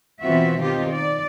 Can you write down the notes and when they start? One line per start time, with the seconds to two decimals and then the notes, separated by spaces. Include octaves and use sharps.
0.21 B2 E3 C4 F4 F#4 E5
0.61 D#3 C4 D#4 F4 G4
0.91 D5